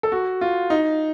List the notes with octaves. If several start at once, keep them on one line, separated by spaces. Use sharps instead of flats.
A4
F#4
F4
D#4